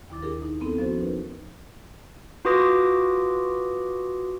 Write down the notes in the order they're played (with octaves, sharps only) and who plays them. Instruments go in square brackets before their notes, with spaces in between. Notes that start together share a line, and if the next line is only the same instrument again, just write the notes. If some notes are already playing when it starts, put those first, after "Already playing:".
[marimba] D#2 D#3 E4 D6 A6
D4 E4 G4 G#4 A#4
D#4
B3 C4 D4 E4 A4
F3 B3 C#4 F#4 C5
D#4 A#4 B4
[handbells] F4 F#4 B4 D6 D#6 A#6